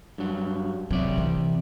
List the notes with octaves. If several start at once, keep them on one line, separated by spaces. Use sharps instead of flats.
G2 F#3
C3 F#3 D5 E5
E3